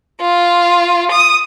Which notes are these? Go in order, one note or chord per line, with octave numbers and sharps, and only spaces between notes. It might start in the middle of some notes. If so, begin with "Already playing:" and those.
F4
D#6